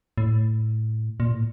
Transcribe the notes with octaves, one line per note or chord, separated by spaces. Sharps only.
A2
A#2
A2